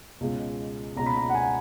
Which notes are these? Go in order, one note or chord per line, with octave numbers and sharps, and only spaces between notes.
C#2 B2 G#3 C#4
C#2 B2 G#3 C#4 A#5
B5
A#5
F#5
G#5